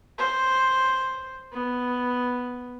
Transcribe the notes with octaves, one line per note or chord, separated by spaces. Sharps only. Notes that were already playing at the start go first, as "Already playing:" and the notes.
C5
B3